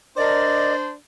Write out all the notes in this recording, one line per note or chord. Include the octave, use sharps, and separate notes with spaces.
D4 A#4 C5 D5 D#5 D6